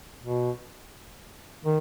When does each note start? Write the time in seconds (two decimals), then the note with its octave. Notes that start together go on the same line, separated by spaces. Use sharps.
0.22 B2
1.64 D#3